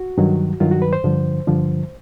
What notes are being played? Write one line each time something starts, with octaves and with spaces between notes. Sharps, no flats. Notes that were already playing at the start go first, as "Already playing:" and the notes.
Already playing: F#4
G2 D#3 F#3
G2 D#3 F#3 F4
F#4
B4
C5
G2 D3 F3
G2 D3 F3